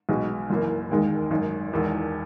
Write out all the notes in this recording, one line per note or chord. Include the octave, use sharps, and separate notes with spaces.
B1 B2 G#3
F#1 F#2 E3 A#3
E1 D#2 D#3 G#3
G#1 F#2 D#3
E1 E2 D#3